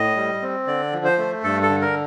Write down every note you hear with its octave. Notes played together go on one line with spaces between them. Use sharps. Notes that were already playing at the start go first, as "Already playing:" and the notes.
Already playing: A2 D#5
G3
C4
D3 D5
F3
C5
A3
G2 A4
A4
D3
A#4